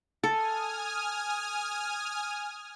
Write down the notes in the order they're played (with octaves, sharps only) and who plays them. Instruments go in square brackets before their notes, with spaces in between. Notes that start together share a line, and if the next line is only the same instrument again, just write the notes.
[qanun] A4 [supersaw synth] G#5 D#6 F6